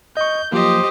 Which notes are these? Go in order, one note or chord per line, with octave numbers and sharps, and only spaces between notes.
D#5 C#6 G6
F3 F#3 A#3 G4 C5 D#5